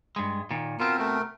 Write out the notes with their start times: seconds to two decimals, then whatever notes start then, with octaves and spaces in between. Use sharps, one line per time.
0.16 G2 G#3
0.51 A#2 D#3
0.80 B2 C4 F4 A#4
0.99 A3 A#4